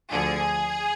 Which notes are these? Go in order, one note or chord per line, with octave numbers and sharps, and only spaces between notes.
D2 D3 F3 G#4